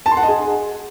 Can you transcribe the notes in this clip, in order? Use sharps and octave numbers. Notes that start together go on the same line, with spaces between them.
A5
C6
F#5
D#5
G#4